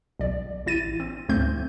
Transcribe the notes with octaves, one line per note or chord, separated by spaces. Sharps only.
B1 D5
A1 E4 A6 D#7
C4
D2 G#2 A3 C4 G6